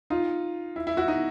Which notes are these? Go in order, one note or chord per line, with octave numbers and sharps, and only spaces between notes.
D#4 F4
E4
E4
E4 F#4
D#4